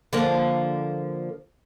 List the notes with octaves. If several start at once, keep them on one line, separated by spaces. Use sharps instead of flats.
D3 F3 A#3